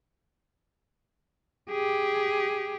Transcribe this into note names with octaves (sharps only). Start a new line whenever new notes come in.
G4 G#4